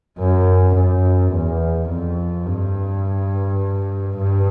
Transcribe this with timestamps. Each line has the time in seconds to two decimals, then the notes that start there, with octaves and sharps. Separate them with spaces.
0.19 F#2
0.76 F#2
1.32 E2
1.90 F2
2.46 G2
4.17 G2